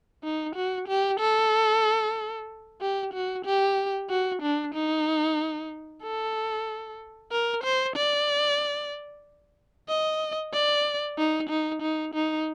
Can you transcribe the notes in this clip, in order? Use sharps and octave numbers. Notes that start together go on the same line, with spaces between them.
D#4
F#4
G4
A4
G4
F#4
G4
F#4
D4
D#4
A4
A#4
C5
D5
D#5
D5
D#4
D#4
D#4
D#4